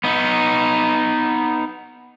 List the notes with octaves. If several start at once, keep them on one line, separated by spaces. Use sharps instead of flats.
B3 D#4